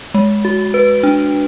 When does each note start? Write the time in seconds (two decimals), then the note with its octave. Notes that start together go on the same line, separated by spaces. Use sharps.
0.14 G#3
0.45 F#4
0.74 B4
1.03 D4